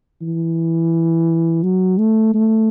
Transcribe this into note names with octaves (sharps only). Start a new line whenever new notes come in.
E3
F#3
A3
A3